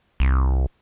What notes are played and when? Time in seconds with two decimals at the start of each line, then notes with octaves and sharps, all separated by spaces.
0.20 C2